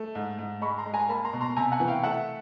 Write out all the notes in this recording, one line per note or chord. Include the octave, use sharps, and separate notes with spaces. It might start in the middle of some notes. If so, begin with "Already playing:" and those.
Already playing: A3
G#2
G#2
G#3 B5 C#6
A#5 C6
G#3
G#5 A#5
A#3 A5 B5
A#5 C6
B2
A#5 C6
C3 G#5 A#5
F#5 G#5
E3
F5 G5
A3 E5 F#5